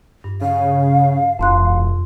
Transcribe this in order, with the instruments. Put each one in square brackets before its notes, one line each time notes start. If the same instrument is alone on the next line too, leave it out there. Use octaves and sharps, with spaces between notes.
[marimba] G2
[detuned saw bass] C#3 [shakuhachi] F5
[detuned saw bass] E1 [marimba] F2 C6 F#6